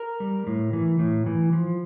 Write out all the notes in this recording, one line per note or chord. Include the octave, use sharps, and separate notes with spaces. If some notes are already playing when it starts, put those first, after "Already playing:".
Already playing: A#4
G3
A2
E3
A2
E3
F3